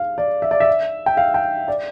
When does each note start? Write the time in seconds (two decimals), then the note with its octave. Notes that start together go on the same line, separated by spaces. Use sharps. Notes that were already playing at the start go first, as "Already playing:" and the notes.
Already playing: F5
0.18 D5
0.42 E5
0.51 D5
0.60 E5
1.06 G5
1.17 F5
1.34 G5
1.68 D5